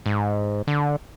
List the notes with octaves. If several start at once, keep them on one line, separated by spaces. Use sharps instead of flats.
G#2
D3